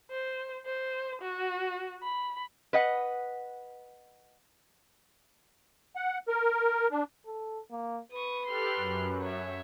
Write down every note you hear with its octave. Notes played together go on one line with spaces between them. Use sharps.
C5
C5
F#4
B5
B4 D#5 F#5
F#5
A#4
D4
A4
A#3
B4 C#6 D#6
G4 A4 C6 F6 F#6
F#2
C#5 E5